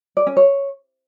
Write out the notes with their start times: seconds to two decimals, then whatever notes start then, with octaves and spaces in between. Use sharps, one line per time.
0.17 D5
0.27 C#4
0.37 C#5